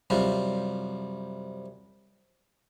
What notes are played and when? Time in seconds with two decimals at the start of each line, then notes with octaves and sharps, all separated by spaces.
0.10 F#2 C3 G3 F4